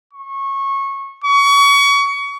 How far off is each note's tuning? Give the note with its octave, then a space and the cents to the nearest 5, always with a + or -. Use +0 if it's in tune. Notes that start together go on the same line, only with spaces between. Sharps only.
C#6 -20
C#6 +30